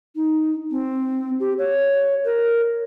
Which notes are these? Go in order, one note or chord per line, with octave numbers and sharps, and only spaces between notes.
D#4
C4
G4
C#5
A#4